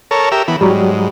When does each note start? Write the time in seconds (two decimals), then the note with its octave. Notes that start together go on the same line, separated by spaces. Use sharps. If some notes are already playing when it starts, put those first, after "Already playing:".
0.11 A4 A#4 C#5
0.32 G4 A#4 E5
0.48 E3 B3
0.61 G#2 F#3 G3